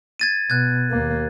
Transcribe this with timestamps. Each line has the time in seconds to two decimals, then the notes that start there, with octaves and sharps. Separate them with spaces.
0.20 G#6 A6 D#7
0.50 B2 F#6 G#6
0.91 D#2 A#3